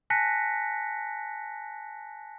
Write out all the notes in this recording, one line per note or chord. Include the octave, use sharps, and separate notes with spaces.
G#5 A5 F#6 A#6 B6 C#7